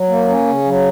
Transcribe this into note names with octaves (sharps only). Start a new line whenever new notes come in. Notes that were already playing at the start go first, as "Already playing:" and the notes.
Already playing: F#3
A#3
C#4
C#3
F#3